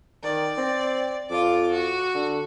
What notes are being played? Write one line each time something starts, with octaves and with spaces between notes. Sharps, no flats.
D#3 D5
C4
F2 F4 D6
F#4
D3